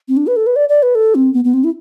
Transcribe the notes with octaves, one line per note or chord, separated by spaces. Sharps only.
C4
D4
B4
A4
B4
D5
D5
B4
A4
C4
B3
B3
C4
E4